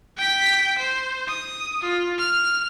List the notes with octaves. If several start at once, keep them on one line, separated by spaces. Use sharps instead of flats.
G5 B6
C5
D#6
F4
F6